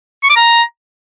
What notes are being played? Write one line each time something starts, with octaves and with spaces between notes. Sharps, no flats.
C#6
D6
A#5